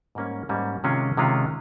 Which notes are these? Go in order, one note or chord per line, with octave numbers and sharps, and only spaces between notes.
G#2 G3 A#3 C#4
G#2 G3 A#3 C#4
C3 D#3 G#3 C#4 F4
C3 D#3 G#3 C#4 F4